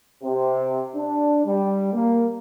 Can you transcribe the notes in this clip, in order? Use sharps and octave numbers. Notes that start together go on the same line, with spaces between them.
C3
D4
G3
A#3